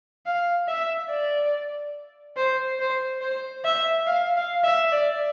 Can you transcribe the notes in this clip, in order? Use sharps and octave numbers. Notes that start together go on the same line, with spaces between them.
F5
E5
D5
C5
C5
C5
E5
F5
F5
E5
D5